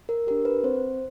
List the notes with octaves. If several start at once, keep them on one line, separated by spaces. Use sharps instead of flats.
A#4
D4 G4 A#4
B4
C4 C5